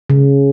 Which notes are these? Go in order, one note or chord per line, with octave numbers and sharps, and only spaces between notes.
C#3